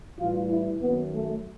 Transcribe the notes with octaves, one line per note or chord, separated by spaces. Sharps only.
A2 E3 G3 F4
E4
F#2 D#3 F#3 B3
A3